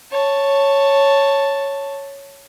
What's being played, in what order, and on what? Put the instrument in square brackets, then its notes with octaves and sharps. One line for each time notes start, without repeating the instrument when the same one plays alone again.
[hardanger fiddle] C#5 A5